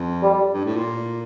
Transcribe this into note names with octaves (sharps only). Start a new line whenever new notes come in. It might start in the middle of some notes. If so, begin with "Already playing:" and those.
Already playing: F2
G3
G3
G2
A2
A#2